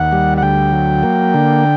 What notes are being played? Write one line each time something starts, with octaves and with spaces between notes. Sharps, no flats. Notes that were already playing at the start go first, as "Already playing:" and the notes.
Already playing: D#2 F#5
G3
F#5
D2 G5
F#3
A#3
D3